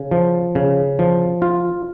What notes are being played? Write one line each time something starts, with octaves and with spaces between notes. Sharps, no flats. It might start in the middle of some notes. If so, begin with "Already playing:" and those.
Already playing: C#3
F3
C#3
F3
F4